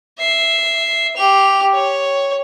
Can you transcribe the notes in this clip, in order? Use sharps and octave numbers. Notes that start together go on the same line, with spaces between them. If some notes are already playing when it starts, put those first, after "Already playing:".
E5 C7
G4 F7
C#5